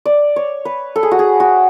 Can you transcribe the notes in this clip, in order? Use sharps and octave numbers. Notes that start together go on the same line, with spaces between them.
D5
C#5
B4
A4
G#4
F#4
G#4
F#4